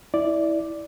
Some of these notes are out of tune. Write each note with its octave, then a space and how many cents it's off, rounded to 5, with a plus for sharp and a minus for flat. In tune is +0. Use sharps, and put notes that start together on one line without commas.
E4 -15 D5 +0